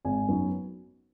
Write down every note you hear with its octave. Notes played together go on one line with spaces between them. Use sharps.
G#1 G#5
F#2 F#3 B3 D#4